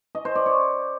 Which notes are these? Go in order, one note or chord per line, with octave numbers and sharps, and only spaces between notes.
D#5
C5
D5
C#5